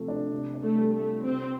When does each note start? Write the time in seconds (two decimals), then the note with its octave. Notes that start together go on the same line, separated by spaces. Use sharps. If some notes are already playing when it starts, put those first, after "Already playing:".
Already playing: C3 F3 A3
0.08 D4
0.32 C3
0.55 D4
0.62 A3
0.78 G3
0.93 A3
1.00 F4
1.23 C3 C4